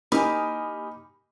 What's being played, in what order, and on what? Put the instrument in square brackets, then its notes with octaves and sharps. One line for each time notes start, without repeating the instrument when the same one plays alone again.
[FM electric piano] A#3 D#6 F6 [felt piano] D#4 [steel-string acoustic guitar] G4 G#5 [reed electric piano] B5